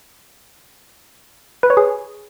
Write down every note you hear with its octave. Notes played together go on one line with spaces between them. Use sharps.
B4
C#5
G#4